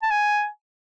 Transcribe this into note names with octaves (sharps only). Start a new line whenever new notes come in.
A5
G#5